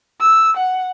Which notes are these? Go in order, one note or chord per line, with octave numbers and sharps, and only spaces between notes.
E6
F#5